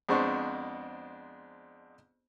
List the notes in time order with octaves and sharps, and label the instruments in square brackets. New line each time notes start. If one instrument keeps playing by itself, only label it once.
[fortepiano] F2 G#3 B3 D4 C5 C#6